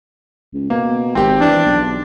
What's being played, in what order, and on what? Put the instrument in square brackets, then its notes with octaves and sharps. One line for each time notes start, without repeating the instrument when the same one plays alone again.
[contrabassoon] C#2
[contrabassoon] B2 [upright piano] A#3
[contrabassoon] G#1 [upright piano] C4 G4
[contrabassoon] E3 [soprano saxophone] D4
[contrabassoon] B1